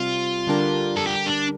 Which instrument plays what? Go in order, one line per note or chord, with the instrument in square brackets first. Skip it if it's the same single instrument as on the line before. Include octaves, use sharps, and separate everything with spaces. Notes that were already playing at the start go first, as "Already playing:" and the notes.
Already playing: [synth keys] C3 G3 C4 [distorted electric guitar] F4
[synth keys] D3 G3 D4 G4 A#4
[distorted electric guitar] A4
G4
D4